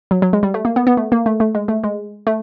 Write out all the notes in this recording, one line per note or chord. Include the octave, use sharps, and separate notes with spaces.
F#3
F#3
G#3
G3
A3
A#3
B3
B3
A3
A#3
A3
A3
G#3
A3
G#3
A3